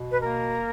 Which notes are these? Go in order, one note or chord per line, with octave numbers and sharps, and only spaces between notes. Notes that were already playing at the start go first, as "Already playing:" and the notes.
Already playing: B2
B4
A#3 A#4